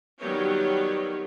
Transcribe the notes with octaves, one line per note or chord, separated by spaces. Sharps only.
D#3 F#3 G3 B3 G4 C#5